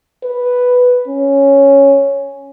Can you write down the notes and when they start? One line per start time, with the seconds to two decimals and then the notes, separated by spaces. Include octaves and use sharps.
0.24 B4
1.08 C#4